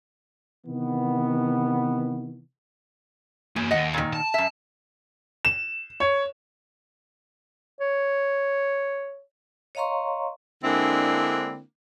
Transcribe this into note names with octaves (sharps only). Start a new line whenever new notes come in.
C3 D#3 E3 B3
E2 A#3 F#4
D#2 D#5 F#5
A#2 D#3
A5
F#2 E5
E7
C#5
C#5
C#5 D#5 F5 A#5 C6 C#6
D3 G#3 A#3 C4 D4 E4